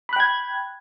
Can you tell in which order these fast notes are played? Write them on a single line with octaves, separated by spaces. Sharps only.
B5 F#6 G5 G#6